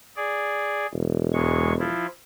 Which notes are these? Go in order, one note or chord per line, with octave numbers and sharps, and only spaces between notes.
G#4 D5
E1
E2 G#3 C#6
F3 E4 F4